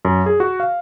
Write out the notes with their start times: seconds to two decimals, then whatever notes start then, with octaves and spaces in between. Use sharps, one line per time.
0.05 F#2
0.26 G#4
0.40 F#4
0.60 F5